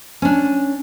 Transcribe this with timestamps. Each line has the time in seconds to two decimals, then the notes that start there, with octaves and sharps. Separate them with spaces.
0.22 C#4 D4